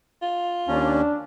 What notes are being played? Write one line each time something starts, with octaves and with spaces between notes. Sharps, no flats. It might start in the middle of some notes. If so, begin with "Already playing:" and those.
F4
D#2 C#4 D4